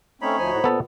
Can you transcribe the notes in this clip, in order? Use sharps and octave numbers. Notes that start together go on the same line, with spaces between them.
A3 C4 C#4 D#4 C#5 B5
D2 F3 C5 G#5
A2 F#4
A#2 B3 A4